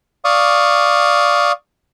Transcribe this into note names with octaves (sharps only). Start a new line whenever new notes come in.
D5 F5 C#6 D#6